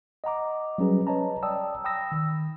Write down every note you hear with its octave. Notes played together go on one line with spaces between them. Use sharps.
D#5 F#5 A#5 D6
F#3 G3 C#4 G#4 B4
B4 C#5 D#5 A5 A#5
D5 G5 A5 A#5 D#6 E6
G5 B5 D#6 E6 A#6
D#3